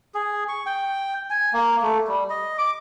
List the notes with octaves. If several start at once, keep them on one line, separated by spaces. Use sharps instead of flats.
G#4
C#6
G5
G#5
A#3
A3
G3
D#5
D6